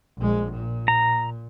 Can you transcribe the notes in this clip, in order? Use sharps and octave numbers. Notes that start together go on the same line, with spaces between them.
A#1 G#3
A#2
A#5